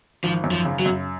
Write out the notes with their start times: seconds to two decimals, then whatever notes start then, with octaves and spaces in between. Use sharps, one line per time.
0.23 G#1 F3
0.44 F#2
0.51 F3
0.65 C#3
0.79 F#3
0.86 F#2